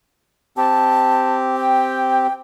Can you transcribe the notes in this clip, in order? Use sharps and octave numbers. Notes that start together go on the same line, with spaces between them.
C4 G4 A5
G5